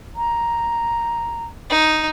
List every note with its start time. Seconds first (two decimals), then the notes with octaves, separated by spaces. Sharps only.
0.16 A#5
1.70 D#4